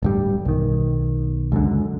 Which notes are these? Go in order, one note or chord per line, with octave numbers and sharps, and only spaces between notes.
D1 G2 G3
B1 D#3
C#2 F#2 D3